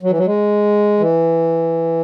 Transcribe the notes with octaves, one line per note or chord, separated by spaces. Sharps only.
F#3
E3
F#3
G#3
E3